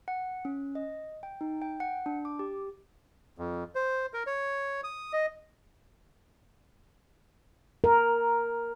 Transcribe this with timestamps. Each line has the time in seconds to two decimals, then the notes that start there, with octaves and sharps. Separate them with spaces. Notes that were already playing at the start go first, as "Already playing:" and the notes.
0.08 F#5
0.45 C#4
0.75 D#5
1.23 G5
1.41 D#4
1.62 G5
1.80 F#5
2.06 D4
2.25 D6
2.39 G4
3.38 F2
3.75 C5
4.13 A#4
4.27 C#5
4.84 D#6
5.13 D#5
7.84 A#4